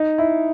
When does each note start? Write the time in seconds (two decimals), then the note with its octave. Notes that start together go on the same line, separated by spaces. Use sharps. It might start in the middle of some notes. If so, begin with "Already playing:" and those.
Already playing: D#4
0.18 E4